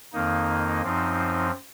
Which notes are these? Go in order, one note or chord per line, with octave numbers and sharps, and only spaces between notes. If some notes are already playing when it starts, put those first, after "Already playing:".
F2 D#3 A#3 D#4
F#2 F3 C4 D#4